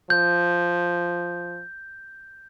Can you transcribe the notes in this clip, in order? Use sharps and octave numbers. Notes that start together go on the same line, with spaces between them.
F3 G6